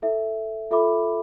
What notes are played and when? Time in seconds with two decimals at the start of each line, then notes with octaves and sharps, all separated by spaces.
0.02 E4 A4 E5
0.71 F4 A4 E5 B5 D6